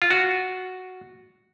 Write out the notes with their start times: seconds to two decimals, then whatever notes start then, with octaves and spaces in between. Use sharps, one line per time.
0.02 F4
0.11 F#4